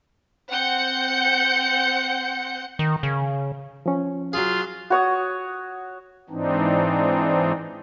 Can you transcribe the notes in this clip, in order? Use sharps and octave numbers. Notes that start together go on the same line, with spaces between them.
C4 F#5 G6 C#7
D#3
C#3
F3 C#4
F#3 F4 G#4
F#4 C#5 D#6
G#2 E3 C4 D4 D#4